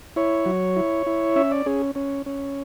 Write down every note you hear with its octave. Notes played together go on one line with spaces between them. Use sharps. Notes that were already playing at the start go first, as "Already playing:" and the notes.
E4 C#5
F#3
E4
E4
C#4 E5
D5
C#4 G#4
C#4
C#4